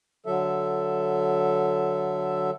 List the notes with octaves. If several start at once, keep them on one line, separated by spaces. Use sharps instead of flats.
D3 F#3 A4 E5